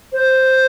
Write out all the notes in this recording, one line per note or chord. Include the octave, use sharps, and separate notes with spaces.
C5